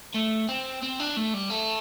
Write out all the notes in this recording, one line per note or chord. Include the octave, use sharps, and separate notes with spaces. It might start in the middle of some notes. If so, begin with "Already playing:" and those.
A3
C4
C4
D4
A3
G3
A3